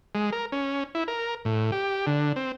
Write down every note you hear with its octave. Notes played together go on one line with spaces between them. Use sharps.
G#3
A#4
C#4
E4
A#4
A2
G4
D3
C4